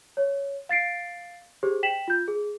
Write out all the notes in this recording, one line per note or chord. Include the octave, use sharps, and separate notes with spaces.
C#5
F5 A6 C7 D7
G4 G#4 C5
G5 B6 E7 F#7
F4 G6
G#4